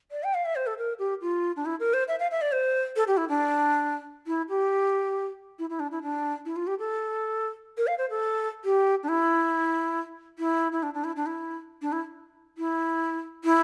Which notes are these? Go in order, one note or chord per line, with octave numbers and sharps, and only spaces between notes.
D5
G5
F5
E5
C5
A4
A#4
G4
F4
D4
E4
A#4
C5
E5
F5
E5
D5
C5
A4
G4
E4
D4
E4
G4
E4
E4
D4
E4
D4
E4
F4
G4
A4
A#4
F5
C5
A4
G4
D4
E4
E4
E4
D4
D4
E4
D4
E4
D4
E4
E4
E4